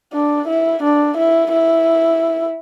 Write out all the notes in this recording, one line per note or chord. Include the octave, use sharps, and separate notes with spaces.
D4
E4
D4
E4
E4